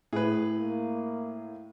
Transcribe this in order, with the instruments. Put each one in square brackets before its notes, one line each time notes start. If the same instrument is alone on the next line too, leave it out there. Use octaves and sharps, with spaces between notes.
[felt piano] A2 [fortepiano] G#4 B4
[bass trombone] A#3